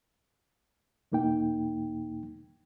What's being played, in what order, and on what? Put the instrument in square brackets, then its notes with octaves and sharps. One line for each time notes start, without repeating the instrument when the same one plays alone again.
[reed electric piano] E2 B2 A#3 D#4 G5